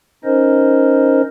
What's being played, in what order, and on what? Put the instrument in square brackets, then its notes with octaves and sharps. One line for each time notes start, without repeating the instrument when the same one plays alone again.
[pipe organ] C#4 D#4 A#4 C5 D#5